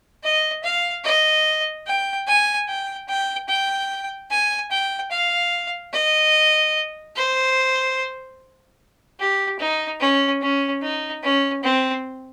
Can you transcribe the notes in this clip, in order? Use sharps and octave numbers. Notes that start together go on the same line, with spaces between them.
D#5
F5
D#5
G5
G#5
G5
G5
G5
G#5
G5
F5
D#5
C5
G4
D#4
C#4
C#4
D#4
C#4
C4